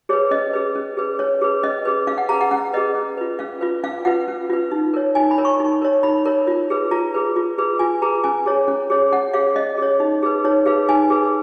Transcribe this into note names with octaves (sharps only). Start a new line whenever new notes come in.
G#4 B4 C#5
C#4 D#5
G#4 B4
C#4
G#4 B4
C#4 C#5
G#4 B4
C#4 D#5
G#4 B4
C#4 F5
F#5
G#4 B4 A#5
F#5
C#4 F#5
G#4 B4 D#5
C#4
F4 B4
C#4 F5
F4 B4
C#4 F5
F4 B4 F#5
C#4
F4 B4
D#4
A#4 C#5
D#4 G#5
B5
A#4 C#5
C#6
D#4
A#4 C#5
D#4 B5
A#4 C#5
F4
G#4 B4
F4 A#5
G#4 B4
F4
G#4 B4
F4 G#5
G#4 B4 A#5
C#4 G#5
G#4 C#5
C#4
G#4 C#5
C#4 F#5
G#4 C#5 F5
C#4 D#5
G#4 C#5
D#4
G#4 B4
D#4 C#5
G#4 B4 F5
D#4 G#5
G#4 B4